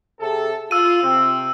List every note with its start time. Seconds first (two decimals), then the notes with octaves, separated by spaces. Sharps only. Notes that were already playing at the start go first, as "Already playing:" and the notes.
0.20 C3 G#4 A4
0.71 F4 E6 D#7
1.02 C3 C4